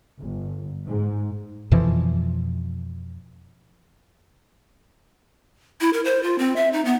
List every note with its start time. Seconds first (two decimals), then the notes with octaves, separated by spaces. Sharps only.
0.20 G1
0.87 G#2
1.71 F2 B2 E3 F3
5.81 E4
5.93 A#4
6.05 C5
6.23 F4
6.38 C4
6.56 E5
6.73 D#4
6.85 B3